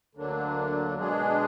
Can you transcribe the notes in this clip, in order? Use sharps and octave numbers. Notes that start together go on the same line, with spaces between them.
D2 D3 F#3 A#3 D4
B2 G#3 D4 G#4